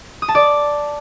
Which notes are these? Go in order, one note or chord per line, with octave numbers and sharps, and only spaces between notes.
D#6
A5
D5